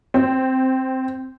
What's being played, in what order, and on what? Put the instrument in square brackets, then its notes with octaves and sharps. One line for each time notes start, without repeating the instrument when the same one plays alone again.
[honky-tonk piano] C4